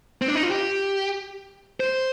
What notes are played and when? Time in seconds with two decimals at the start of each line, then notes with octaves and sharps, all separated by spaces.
0.22 C4
0.28 D4
0.35 D#4
0.43 F4
0.50 G4
1.80 C5